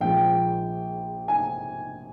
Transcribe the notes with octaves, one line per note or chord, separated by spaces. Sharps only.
A#1 A#2 F3 G#3 G5
G#5